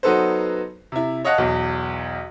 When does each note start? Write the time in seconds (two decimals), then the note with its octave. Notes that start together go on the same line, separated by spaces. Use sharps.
0.03 F#3 B3 D#4 A4 B4 C5
0.92 C3 E4
1.24 C#5 D#5 F5 F#5 A5
1.38 B1 E2